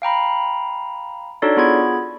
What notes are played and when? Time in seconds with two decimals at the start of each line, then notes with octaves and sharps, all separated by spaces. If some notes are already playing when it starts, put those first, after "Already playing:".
0.02 F5 G5 A#5 B5
1.42 D4 D#4 F#4 A4 C#5 D5
1.57 B3 F4 G#4 B5 G#6